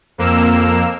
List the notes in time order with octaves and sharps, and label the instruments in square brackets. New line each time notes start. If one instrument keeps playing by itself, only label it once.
[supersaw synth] F2 A#3 E6 E7